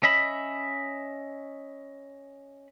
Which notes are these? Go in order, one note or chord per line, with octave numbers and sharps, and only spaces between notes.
C#4 D#5 E5 B5